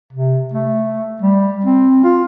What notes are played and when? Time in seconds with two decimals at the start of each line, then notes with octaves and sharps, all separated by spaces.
0.13 C3
0.53 A3
1.21 G3
1.64 C4
2.04 F4